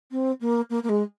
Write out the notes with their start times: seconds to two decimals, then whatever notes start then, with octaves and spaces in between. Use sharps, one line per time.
0.11 C4
0.40 A#3
0.70 A#3
0.83 A#3
0.89 G#3